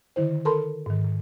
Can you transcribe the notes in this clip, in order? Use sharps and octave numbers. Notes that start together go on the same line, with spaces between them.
D3 D#3 E4 C5
A4 A#4 A5 B5 C6
G#2 D#3